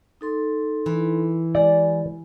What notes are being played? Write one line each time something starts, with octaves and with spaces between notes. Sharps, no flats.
D#4 A4 C6
E3
G#3 G4 D5 G#5